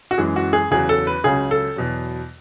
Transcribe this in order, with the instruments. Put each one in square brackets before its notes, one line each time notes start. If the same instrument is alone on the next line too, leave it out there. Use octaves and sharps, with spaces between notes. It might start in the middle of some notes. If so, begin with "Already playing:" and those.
[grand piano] F#4
F#2 E3 G#3 G#4
F#4
G#4
E2 C#3 F#3 G#4
A4
B4
C#2 C#3 F#3 G#4
A4
E2 B2 F#3